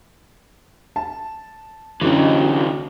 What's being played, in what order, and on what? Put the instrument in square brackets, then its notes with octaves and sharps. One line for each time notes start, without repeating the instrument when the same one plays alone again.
[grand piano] A5
[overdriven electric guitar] C2 E3 [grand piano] D3 F#3 C#4